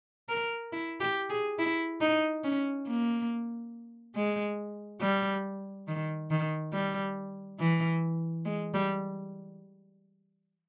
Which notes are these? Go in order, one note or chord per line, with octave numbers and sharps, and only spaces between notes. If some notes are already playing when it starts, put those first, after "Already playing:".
A#4
E4
G4
G#4
E4
D#4
C#4
A#3
G#3
G3
D#3
D#3
G3
E3
G#3
G3